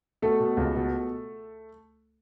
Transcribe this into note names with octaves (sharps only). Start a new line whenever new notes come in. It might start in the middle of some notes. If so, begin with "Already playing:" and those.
B2 A3 A4
B2
C#2
B2